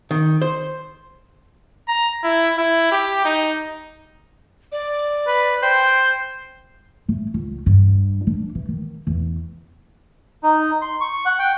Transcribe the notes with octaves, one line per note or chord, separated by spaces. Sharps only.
D#3
C5
A#5
E4
E4
G4
D#4
D5
B4
C5 G5
A2
C#2
G2
D4
E3
D#3
E2
D#4
C6
C#6
F#5
G5